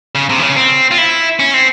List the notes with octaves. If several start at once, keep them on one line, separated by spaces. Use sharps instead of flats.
C#3
C3
E3
C#3
C4
F4
E4
C#4
C4